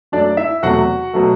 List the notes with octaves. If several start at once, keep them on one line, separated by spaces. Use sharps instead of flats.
F#2 F#3 A3 D4 D5
E4 E5
E2 C3 F#3 A3 F#4 F#5
B2 F#3 A3